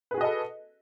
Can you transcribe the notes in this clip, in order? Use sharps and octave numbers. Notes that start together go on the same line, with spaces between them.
F#4 G#4 A4 B4 D#5